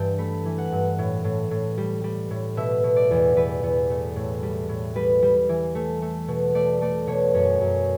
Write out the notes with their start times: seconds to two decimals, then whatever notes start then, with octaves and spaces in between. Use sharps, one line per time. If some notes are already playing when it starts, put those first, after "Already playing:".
Already playing: G2 E3 G5 A5
0.18 A3 B5
0.45 E3
0.58 F#5
0.72 G2
0.98 A2
1.24 A2
1.51 A2
1.78 G3
2.04 G3
2.30 A2
2.57 B2 E5
2.84 B2
2.96 D5
3.11 E2
3.36 E2 B4
3.63 E2
3.90 A3
4.16 A2
4.43 G3
4.69 A2
4.95 G3 B4
5.22 G3
5.49 E3
5.75 A3
6.02 A3
6.28 B2
6.54 A3 D5
6.81 A3 D5
7.07 B2 C#5
7.34 F#2 C#5
7.61 F#2